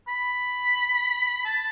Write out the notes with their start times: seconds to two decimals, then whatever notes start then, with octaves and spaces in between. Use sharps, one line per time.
0.08 B5
1.45 A5